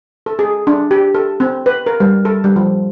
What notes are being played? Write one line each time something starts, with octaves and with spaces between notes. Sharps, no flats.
A4
G#4
D4
G4
A4
C4
B4
A#4
G3
A4
G3
F3